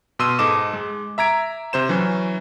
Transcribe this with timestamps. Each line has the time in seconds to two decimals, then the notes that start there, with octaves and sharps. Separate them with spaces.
0.19 B2 C6 E6 D#7
0.39 G#2 A4 D#5 D6 E7
0.73 G#3
1.18 E5 A#5 G#6 D7
1.73 C3 C5 E7
1.89 E3 F#3 C#4